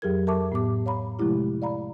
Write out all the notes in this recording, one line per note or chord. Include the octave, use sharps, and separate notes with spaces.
F2 F#3 G4 G#4 A#4 G#6
A4 A#4 E5 A5 C#6 D6
A2 B3 G4 D6
C#5 F5 A#5 B5
C3 F3 G#3 A3 E4 G4
D5 F5 A#5 B5